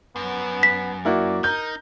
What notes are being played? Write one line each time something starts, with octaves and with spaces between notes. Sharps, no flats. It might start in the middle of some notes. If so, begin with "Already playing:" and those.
F#2 B3
B6
A#3 E4 F#4 D5
D#4 A#4 G6